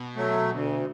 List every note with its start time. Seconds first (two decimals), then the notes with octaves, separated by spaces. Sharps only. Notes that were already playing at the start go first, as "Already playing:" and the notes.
Already playing: B2
0.16 F#3 A3
0.50 D2